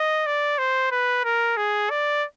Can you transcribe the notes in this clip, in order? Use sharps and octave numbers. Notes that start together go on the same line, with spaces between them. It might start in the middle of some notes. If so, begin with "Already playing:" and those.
Already playing: D#5
D5
C5
B4
A#4
G#4
D5